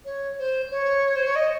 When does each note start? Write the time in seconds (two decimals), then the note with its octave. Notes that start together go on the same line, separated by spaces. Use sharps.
0.05 C#5
0.38 C5
0.70 C#5
1.15 C5
1.26 C#5
1.35 D#5